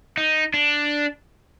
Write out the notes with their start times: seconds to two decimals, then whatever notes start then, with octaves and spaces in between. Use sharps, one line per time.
0.18 D#4
0.54 D4